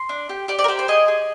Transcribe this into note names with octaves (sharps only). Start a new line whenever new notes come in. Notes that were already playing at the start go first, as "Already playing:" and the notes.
Already playing: C6
D4
G4
G4 D5
D5
A#4
G4 C5
C5
G#4 D#5
G#4